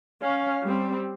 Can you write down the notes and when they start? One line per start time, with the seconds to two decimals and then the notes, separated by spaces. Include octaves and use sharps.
0.21 C#4 F5
0.63 G3 C4